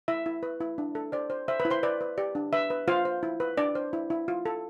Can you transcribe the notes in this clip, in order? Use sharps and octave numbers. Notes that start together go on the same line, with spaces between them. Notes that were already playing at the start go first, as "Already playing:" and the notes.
E4 E5
E4
B4
E4
D4
A4
C5 D5
C5
C5 E5
B4 B5
E4
C5 C6
B4 D5
B4
G4 D5
D4
B4 E5
B4
F4 C5 F5
C5
E4
B4
D4 D5
C5
E4
E4
F4
A4